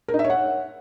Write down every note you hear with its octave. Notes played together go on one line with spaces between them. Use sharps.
A#4
D#4
E5
C#5
F#5